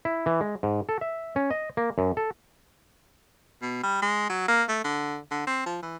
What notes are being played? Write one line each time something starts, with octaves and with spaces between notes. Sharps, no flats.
E4
E3
G#3
G#2
A4
E5
C#4
D#5
A#3
F#2
A4
B2
G3
G#3
F#3
A#3
A3
D3
D3
C4
F3
E3